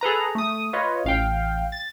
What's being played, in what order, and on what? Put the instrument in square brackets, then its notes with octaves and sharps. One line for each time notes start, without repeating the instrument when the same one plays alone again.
[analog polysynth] G#4 A4 B4 A#5
A3 D#6
F4 B4 C#5 D#5
A1 F5 G5
A6